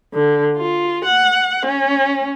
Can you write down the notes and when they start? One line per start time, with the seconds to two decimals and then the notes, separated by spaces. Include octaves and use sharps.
0.14 D3
0.57 F4
1.05 F#5
1.66 C#4